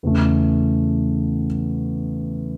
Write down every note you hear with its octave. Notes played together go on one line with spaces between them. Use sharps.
E2 C#3 E3 A3